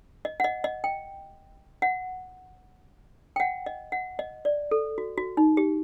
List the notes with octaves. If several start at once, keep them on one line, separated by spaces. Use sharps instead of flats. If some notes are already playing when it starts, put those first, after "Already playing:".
D#5
F#5
D#5
D#5
G5
F#5
G5
F#5
D#5
F#5
D#5
D5
A4
F#4
F#4
D#4
G4